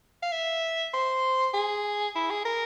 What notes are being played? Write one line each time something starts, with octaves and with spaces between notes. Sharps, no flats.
F5
E5
C5
G#4
E4
G#4
A#4